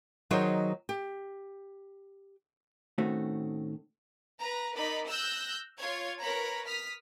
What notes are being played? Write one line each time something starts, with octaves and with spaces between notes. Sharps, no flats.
D#3 F#3 D#4 G#4 C5 C#5
G4
A2 D#3 A3 C4 C#4 F#4
B4 A#5
D#4 A#4 D5 B5
E6 F#6 G6 A#6
F4 C#5 G#6
A#4 B4 C#5 A#5 B5
D#6 F6 B6